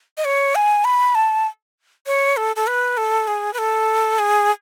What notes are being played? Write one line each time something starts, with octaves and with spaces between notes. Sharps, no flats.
D#5
C#5
G#5
B5
A5
C#5
A4
A4
B4
A4
G#4
B4
A4
G#4